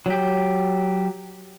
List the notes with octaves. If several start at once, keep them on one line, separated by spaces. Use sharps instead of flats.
F#3 G4